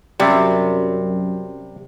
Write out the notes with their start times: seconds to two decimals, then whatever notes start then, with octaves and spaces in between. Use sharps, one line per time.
0.20 F#2 C3 G3 D5 E5